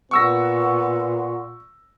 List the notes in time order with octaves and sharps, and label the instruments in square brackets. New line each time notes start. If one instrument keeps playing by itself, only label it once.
[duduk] A#2 [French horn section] B3 [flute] F#5 [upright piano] C#6 E6 A#6